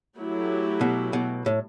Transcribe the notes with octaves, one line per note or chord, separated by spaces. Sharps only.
F#3 A3 E4 G4
B2
B2
A2